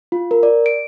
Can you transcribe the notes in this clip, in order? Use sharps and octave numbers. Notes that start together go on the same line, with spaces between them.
F4
A#4
D5
D7